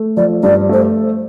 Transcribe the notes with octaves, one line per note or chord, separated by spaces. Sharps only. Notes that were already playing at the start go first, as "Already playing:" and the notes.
Already playing: A3
F3 D5
G2 D5
A3 C5